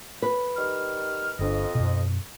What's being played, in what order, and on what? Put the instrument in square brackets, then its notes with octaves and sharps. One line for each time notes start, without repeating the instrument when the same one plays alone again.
[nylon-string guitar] B4
[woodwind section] D#3 G3 F6
[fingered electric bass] G1 D4 [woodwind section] F2 D#5
[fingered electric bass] F#2 B2